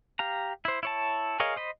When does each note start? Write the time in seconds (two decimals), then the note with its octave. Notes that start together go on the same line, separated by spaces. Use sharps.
0.19 G4 F5 A#5
0.65 E4 C5
0.83 E4 C#5 A5
1.40 G#4 A#4 C#5 D#5 F5
1.56 C5 D#5 B5